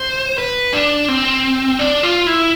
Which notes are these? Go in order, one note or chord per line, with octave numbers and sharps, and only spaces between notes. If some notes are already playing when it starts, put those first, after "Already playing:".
Already playing: C5
B4
D4
C4
D4
F4
E4